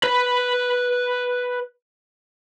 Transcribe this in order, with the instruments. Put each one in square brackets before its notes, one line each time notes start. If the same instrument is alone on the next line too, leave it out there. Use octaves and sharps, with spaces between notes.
[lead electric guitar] B4 B5